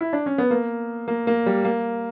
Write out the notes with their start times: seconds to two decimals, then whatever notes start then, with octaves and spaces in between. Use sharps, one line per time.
0.01 E4
0.13 D4
0.26 C#4
0.38 B3
0.51 A#3
1.08 A#3
1.27 A#3
1.46 G3
1.64 A#3